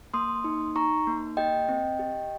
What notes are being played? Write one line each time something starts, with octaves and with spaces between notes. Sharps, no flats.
A#3 C6 D#6
D#4
D#4 A#5 C#6
A#3
G4 D#5 G5
C4
G4